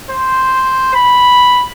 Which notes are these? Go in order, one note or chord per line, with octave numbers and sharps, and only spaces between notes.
C5
B5